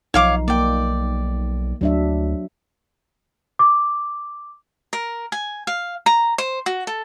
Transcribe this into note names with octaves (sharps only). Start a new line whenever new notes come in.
B1 F3 D#4 C#5 F5 D6
A#3 D5 G5
D2 F#3 D4 E5
D6
A#4
G#5
F5
A#5
C5
F#4
A4